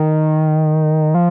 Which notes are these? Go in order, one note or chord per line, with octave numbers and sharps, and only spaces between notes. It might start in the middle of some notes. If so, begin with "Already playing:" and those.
Already playing: D#3
F3